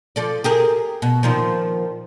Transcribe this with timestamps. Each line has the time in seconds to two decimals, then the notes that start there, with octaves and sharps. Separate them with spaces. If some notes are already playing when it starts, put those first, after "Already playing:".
0.16 F3 A4 D5
0.44 G4 G#4 A#4
1.02 B2
1.23 A#2 D#3 F3